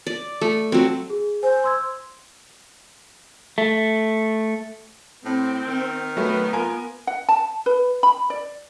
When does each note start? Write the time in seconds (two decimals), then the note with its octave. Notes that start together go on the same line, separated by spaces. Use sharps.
0.07 D5
0.41 A3
0.72 F#3 C4
1.10 G#4
1.43 C5 G#5
1.64 C6 E6 G#6
3.58 A3
5.25 A2 C4
5.67 D#3
6.17 F#3 A3 B3 B4
6.53 F4 A#4 G#5
7.07 F#5
7.29 A5
7.66 B4
8.03 B5
8.30 D5